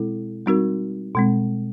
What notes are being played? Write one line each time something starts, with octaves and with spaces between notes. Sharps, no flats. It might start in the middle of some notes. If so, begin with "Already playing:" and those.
Already playing: B2 G#3 C4 E4 A4
G3 C4 D#4 F#4 A#4
B2 G#3 C4